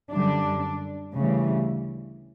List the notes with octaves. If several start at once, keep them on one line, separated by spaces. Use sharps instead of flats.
F#2 D3 G3 D4
D2 C#3 E3 G3